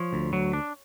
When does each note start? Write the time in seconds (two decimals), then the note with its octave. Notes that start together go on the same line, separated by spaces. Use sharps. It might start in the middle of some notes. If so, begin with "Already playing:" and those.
Already playing: F3 C#5
0.13 D2
0.33 F#3
0.53 D4